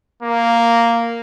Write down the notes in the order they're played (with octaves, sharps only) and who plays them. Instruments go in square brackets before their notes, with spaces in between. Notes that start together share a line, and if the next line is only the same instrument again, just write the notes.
[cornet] A#3